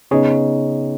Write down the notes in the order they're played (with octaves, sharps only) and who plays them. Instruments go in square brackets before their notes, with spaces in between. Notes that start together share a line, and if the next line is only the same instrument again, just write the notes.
[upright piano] C#3 B3 D#4 [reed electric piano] G#4 C#5